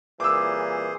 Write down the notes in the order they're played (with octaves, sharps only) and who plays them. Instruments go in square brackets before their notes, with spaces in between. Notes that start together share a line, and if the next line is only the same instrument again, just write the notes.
[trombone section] C2 A#2 E3 [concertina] G#4 C5 [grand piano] D6 E6